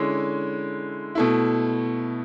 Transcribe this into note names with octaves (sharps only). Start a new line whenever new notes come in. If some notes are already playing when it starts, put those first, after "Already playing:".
Already playing: D3 G#3 C#4 E4
B2 A3 E4